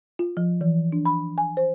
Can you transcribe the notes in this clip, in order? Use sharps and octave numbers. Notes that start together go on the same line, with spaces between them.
F4
F3
E3
D4
B5
G#5
C5